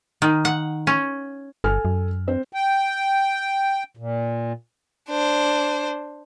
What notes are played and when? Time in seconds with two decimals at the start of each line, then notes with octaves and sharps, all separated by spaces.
0.22 D#3
0.45 F#5
0.87 C#4
1.64 G1 A4 G#5 F6
1.85 F#2
2.28 C4 C5
2.53 G5
3.97 A#2
5.09 D4 C5